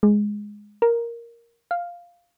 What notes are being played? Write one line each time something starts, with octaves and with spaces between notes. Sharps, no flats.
G#3
A#4
F5